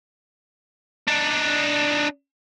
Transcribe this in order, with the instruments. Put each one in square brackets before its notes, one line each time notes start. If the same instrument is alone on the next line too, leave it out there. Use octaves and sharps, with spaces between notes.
[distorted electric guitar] D4 D#4